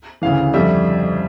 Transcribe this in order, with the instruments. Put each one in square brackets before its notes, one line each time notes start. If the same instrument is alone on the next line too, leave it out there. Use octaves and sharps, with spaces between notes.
[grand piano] D2 C#3 E3 F5
F2 D3 G3 E5